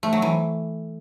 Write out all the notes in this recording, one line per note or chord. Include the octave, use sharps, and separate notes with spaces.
A3
F#3
E3